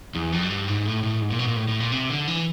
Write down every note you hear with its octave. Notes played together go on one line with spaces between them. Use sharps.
E2
F2
F#2
G2
G#2
A2
A2
G#2
A#2
B2
A#2
A2
A2
A#2
C3
D3
E3